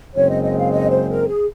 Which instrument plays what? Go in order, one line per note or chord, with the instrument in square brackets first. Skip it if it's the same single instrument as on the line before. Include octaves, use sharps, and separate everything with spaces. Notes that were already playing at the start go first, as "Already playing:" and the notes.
[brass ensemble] F#1 F#2 C#3 G#3 C4 [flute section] C#5
[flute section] D#5
D#5
F5
D#5
C5
A#4
G#4